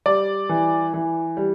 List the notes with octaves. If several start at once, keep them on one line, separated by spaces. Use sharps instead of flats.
G3 D5
E3
E3
G3